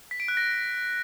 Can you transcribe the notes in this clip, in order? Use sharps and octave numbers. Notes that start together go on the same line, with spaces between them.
B6
D7
F#6
A#6